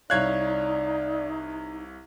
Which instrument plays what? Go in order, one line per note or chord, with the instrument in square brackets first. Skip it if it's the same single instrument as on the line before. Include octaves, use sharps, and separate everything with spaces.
[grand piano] C2 C#5 F5 [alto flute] D#4 [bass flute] D5 [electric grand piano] F#6 G#6